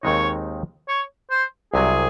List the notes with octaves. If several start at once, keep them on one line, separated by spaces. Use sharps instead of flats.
D#2 D#3 G#3 C4 D#4 C#5
C#5
C5
C2 C3 F#3 G#4